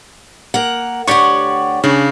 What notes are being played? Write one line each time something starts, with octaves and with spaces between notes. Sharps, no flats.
A#3 A#4 F#5
D2 G4 C#5 D5 F#5 C#6
C#3 D4